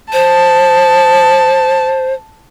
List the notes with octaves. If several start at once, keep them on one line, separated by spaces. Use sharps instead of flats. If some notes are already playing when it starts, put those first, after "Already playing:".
C5 A5